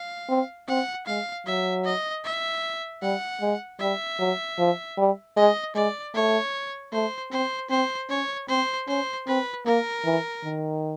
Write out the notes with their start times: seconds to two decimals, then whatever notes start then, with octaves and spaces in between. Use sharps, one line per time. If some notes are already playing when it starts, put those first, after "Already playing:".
Already playing: F5
0.29 C4
0.68 C4 F#5
1.06 G#3 F5
1.46 F#3 E5
1.85 D#5
2.24 E5
3.02 G3 F#5
3.41 G#3
3.80 G3 E5
4.19 F#3
4.58 F3
4.97 G3
5.37 G#3 D#5
5.75 G#3 D5
6.14 A3 C#5
6.92 A3 C5
7.31 C4 C5
7.70 C4 C5
8.09 C#4 C#5
8.48 C4 C5
8.88 C#4 C5
9.27 C4 B4
9.66 A#3 A#4
10.05 E3
10.44 D#3